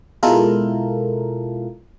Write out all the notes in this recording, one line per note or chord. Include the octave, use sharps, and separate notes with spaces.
B2 G#3 E4 F4 A4 A#4